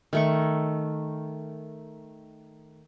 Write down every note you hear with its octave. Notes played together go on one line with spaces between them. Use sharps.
D#3 A3 C#6